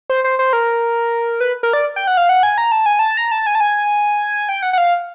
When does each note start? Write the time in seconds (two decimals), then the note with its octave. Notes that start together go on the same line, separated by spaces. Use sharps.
0.10 C5
0.24 C5
0.39 C5
0.53 A#4
1.41 B4
1.63 A#4
1.73 D5
1.96 G5
2.07 F#5
2.17 F5
2.29 F#5
2.43 G#5
2.58 A#5
2.72 A5
2.86 G#5
2.99 A5
3.17 A#5
3.32 A5
3.47 G#5
3.55 A5
3.60 G#5
4.49 G5
4.63 F#5
4.73 F#5
4.78 F5